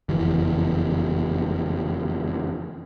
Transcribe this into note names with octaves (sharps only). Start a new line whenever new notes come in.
F#1 F2 E3